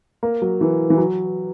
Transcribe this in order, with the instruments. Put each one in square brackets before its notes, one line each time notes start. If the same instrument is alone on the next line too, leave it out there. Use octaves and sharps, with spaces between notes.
[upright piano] A#3
F#3
E3
E3
F#3